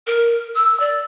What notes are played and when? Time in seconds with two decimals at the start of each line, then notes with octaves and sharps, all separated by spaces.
0.07 A#4
0.55 E6
0.80 D5